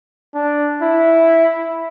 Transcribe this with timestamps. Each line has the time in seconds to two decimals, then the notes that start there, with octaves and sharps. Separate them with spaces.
0.34 D4
0.82 E4